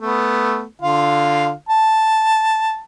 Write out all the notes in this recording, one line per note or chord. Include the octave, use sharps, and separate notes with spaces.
A3 B3
D3 F4 F5
A5